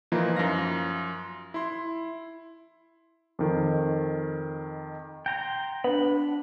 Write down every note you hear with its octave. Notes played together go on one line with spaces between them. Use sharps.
E3 F3 A#3 D#4 F4
F#2 F3 F5 A#6
E4 C6
F2 D#3
G5 A#5 C6
B3 D4 B5